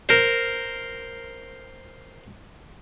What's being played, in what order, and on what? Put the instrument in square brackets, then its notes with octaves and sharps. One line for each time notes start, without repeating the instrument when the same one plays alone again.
[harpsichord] A#4 C5